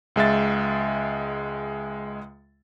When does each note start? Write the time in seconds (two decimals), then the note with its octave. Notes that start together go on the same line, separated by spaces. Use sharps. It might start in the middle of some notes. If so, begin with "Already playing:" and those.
0.16 C#2 G#3 E5 A6